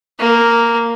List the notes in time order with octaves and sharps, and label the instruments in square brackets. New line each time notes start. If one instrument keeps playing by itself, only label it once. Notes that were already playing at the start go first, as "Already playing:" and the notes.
[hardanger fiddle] A#3